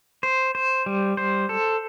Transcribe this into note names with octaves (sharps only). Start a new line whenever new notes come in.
C5
C5
G3
C5
A4